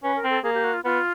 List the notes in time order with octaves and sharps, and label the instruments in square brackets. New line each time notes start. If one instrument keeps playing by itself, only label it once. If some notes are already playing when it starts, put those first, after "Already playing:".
[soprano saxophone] C#4 [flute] B4
[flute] A#4
[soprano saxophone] C4
[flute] A4
[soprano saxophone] A#3 [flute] G#4
[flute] G4
F#4
F4
[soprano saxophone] B3 [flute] F4